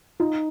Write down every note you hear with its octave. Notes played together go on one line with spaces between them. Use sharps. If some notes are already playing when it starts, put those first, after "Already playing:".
D#4 F4